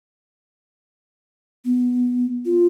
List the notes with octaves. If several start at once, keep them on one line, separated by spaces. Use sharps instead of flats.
B3
F4